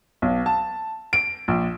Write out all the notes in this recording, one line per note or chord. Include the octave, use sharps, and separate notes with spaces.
B1
A5
D7
A#1